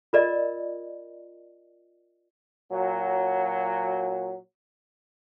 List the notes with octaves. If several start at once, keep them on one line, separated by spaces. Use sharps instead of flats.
F4 A#4 D5 D#5
A#2 F#3